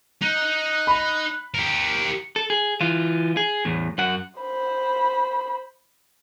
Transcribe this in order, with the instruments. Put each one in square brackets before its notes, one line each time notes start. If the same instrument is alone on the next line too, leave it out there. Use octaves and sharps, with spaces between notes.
[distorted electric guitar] D#4 [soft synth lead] F#6
[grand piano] B5
[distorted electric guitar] G4 A#4 [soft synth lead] C#7
[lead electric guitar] A4
G#4
E3 F4
G#4
E2 A2
F#2 F#5
[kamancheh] C5 B5